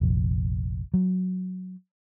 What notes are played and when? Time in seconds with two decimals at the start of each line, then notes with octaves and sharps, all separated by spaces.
0.01 F1 A#1
0.94 F#3